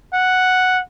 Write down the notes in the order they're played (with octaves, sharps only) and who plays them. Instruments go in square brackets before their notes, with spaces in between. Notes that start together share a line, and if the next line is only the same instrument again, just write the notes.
[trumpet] F#5